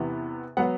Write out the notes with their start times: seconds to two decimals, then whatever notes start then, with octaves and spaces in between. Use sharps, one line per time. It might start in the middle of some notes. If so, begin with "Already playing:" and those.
Already playing: E2 C3 E3 B3
0.57 F#3 B3 F#5